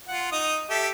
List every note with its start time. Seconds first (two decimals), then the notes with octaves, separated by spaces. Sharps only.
0.08 F4 F#5
0.32 D#4 D#6
0.70 G4 A4 E5